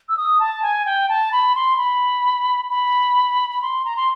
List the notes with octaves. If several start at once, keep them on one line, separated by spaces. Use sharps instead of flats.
E6
D#6
A5
G#5
G5
A5
B5
C6
B5
B5
B5
C6
A#5
C6